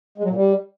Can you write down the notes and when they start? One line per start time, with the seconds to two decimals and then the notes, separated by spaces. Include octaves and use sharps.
0.18 G#3
0.24 F#3
0.29 A#2
0.35 G3